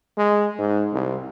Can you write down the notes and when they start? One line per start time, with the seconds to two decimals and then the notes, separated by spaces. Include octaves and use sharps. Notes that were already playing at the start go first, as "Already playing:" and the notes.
0.18 G#3
0.59 G#2
0.93 C2